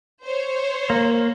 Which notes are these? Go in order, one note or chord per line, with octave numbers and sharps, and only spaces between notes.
C5 C#5
A#3